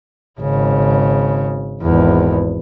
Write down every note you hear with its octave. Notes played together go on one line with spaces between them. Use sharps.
G#1 C#3
G#1 E2